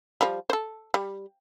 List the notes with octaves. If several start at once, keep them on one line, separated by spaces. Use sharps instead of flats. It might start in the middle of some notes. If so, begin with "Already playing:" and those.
F3 G3
A4 C5
G3